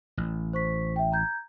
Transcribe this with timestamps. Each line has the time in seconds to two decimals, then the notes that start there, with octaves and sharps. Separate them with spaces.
0.17 A1
0.53 C5 C#6 B6
0.96 E5 G5
1.12 A#5 G6 G#6